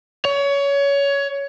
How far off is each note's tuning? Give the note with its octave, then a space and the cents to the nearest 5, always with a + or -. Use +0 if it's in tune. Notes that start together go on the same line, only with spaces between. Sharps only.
C#5 +20